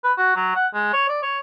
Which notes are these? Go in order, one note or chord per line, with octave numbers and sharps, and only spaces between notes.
B4
F#4
F#3
F#5
G#3
C#5
D5
C#5